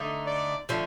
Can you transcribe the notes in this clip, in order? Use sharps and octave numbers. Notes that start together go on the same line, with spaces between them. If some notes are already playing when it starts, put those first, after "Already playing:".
Already playing: D3 A3 D#4
D5
D3 F3 A3